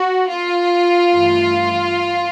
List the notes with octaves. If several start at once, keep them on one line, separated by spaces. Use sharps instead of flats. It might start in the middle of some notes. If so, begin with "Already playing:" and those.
Already playing: F#4
F4
G2 E3 A3